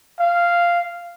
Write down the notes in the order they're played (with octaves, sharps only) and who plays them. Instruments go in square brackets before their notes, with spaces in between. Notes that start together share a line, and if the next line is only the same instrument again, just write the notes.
[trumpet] F5